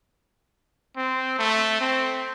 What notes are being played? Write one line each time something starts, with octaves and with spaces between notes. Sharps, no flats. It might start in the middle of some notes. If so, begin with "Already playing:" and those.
C4
A3
C4